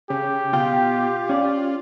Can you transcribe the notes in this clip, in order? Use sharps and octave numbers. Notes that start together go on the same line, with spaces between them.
C#3 G4
B2 F4 G5
C#4 D5